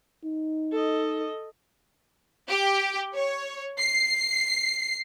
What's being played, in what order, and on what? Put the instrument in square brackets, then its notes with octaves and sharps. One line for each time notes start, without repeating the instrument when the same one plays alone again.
[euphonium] D#4
[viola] A4 D#5
[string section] G4
C#5
C7